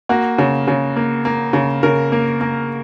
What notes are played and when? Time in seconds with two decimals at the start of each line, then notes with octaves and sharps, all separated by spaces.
0.09 A#3 F#4
0.38 C#3
0.68 C#3
0.96 A#3
1.25 A#3
1.53 C#3
1.83 C#3 A#4
2.12 A#3
2.41 A#3